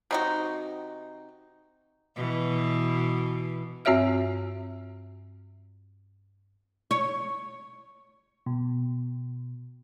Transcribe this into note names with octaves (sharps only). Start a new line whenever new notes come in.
C3 D#4 F#4
B2 E3
G2 C4 F#4 C#5 E5 F6
C#5
B2